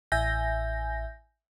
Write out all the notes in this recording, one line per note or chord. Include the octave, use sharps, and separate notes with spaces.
A1 E5 G#5 G6 A#6